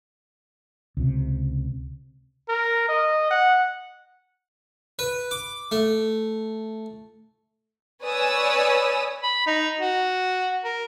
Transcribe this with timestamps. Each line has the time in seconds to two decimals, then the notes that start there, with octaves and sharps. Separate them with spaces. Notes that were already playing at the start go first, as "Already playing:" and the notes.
0.97 C#2 C3
2.49 A#4
2.89 D#5
3.31 F#5
4.99 B4
5.31 D6
5.72 A3
8.04 B4 C#5 D5 G#5 D#6 E6
9.23 B5
9.47 D#4
9.80 F#4
10.65 A#4